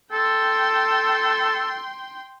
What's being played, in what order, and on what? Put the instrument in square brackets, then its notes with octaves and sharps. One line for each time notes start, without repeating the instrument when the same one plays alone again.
[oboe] A4 [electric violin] G5 C6